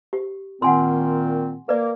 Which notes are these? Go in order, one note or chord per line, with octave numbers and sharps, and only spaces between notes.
G4
A#2 D#3 C4 F#5 G#5 C6
A#3 B4 D5